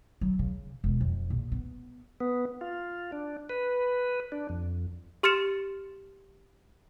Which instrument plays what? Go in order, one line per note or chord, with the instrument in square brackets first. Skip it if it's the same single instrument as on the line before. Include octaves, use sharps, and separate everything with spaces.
[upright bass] F#3
C#3
E1
F2
A#1
B3
[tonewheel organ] B3
F4
D4
B4
D4
F2
[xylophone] G4 C6 F6 A6 C#7 E7